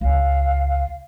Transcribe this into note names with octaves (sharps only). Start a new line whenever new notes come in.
C#2 F5